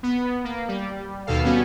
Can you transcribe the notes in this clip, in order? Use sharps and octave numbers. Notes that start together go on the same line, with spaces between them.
B3
A#3
G3
D#2 B2 A4 F5
G3 B3 C#4 F#4